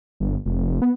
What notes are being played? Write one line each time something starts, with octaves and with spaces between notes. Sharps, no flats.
G1
F1
B3